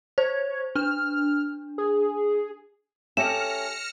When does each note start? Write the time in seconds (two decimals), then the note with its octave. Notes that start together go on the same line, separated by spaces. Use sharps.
0.18 C5 C#5
0.76 D4 F6
1.78 G#4
3.17 C#4 G4 A4 E5 F6 A#6 C#7 E7